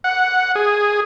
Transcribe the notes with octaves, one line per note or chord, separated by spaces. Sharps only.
F#5
G#4